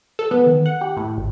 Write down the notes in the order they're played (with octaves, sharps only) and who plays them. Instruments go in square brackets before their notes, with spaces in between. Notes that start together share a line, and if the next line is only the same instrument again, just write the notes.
[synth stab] A4
B3
D#3
F#5
G4
A2
G#1